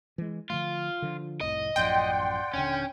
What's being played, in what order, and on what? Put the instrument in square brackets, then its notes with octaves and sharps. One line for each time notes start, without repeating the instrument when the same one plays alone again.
[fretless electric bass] E3 G#3
[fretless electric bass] D3 F3 A3 [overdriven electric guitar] F4
[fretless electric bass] D3 F3
[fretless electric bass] F1 C2 A2 [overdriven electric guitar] D#5
[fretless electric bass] A1 F#2 F3 [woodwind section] D5 F#5 C6 [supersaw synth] G5
[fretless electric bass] D#1 D3 [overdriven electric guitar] C#4